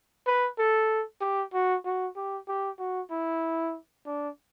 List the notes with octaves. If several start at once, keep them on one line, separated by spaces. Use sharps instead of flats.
B4
A4
G4
F#4
F#4
G4
G4
F#4
E4
D4